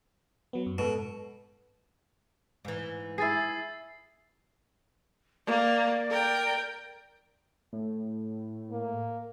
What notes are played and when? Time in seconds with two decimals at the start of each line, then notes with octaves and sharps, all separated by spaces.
0.53 F#3 B3
0.66 F#2
0.78 G#2 B2 A4
2.65 G#2 E3
3.18 E4 G#4 E6 A6 C7
5.46 A#3 D5
6.10 A#4 G5
7.73 A2
8.71 A#3